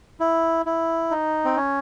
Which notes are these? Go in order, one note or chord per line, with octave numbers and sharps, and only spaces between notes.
E4
E4
D#4
C4
C#4